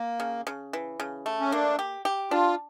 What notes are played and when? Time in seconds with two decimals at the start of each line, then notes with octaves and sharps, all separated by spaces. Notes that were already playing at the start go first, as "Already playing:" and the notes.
Already playing: A#3
0.20 C#3
0.47 C#3
0.73 E3
1.00 C#3
1.26 A3
1.40 C#4
1.52 A#3 D4
1.79 G4
2.05 G4
2.31 D4 F4